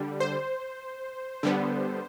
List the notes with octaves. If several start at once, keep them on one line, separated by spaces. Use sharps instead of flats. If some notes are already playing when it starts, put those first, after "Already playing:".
Already playing: D3 G3
C5
D3 G3 B3